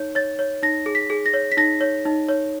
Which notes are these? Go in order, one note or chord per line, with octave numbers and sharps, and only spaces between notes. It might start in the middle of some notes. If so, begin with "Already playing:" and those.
Already playing: D#4 C#5
C#5 A6
C#5
D#4 A#6
G#4
B6
G#4
A#6
C#5
B6
D#4 A#6
C#5
D#4
C#5